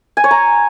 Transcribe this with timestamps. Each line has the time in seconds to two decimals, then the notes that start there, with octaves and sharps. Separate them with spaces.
0.17 G#5
0.24 C#5
0.31 A#5